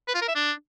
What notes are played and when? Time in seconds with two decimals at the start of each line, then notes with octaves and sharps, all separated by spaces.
0.08 B4
0.15 F4
0.21 A#4
0.28 E5
0.35 D4